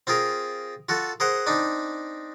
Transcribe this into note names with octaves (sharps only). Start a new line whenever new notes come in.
C4 F4 G#4 A#4
F4 F#4 A4
G#4 A#4 C5 F#5
C4 D4 D#4